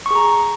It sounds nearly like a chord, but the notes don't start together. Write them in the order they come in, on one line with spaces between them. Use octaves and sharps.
C#6 G#4 A#5